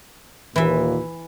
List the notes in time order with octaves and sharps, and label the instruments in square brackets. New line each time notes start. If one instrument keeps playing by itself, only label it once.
[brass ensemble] D#2 A#2 [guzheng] E3 E5